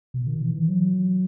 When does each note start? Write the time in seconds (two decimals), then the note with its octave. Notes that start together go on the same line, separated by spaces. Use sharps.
0.14 B2
0.27 D#3
0.41 E3
0.54 E3
0.68 F#3